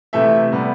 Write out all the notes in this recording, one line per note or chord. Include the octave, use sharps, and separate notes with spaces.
C3 E3 A3 E5
C3 G3 B3